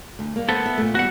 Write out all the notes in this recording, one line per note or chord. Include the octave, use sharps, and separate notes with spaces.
D2
G3 A#3
B3 A4 C5
E5
A#2 A3
E3 G3 B3 F#4 F#5